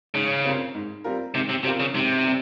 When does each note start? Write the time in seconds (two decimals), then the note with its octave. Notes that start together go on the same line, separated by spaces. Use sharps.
0.14 G#2 C#3
0.44 G3 C4 F4 A#4
0.74 G#2
1.04 G3 C4 F4 A#4
1.34 G#2 C3
1.49 C3
1.64 C3 G3 C4 F4 A#4
1.80 C#3
1.94 G#2 C3
2.24 G3 C4